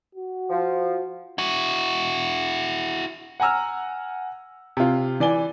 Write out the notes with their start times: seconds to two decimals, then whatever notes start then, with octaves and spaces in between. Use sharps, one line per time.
0.15 F#4
0.50 F3
1.38 E4 F#4
3.40 F#5 G#5 A#5 E6 F6
4.77 C3 F4
5.20 E3 D5 G#5 G7